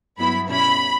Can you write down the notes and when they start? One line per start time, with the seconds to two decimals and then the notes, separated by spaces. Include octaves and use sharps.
0.18 G2 F#3 B3 E4 B5
0.48 B2 G3 C#4 E4 B5